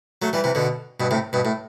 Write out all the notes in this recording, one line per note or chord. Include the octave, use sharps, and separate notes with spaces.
F#3 A3
E3 G3
C3 E3
B2 D3
G2 B2
A2 C3
G2 B2
A2